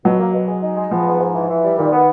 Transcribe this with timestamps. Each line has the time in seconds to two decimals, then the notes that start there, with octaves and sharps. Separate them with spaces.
0.05 B2 F#3
0.19 A#3
0.33 B2
0.48 G#3
0.62 D#4
0.77 G#3
0.91 F3 B3
1.06 G#2
1.20 G#2
1.35 E3
1.49 E3
1.64 G3
1.78 A#2 D#3
1.92 B3